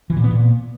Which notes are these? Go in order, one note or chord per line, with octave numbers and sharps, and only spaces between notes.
E3
A#2
B3
A#2